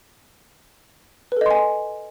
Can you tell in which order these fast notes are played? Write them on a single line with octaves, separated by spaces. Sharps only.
B4 A4 D#5 C6 G#5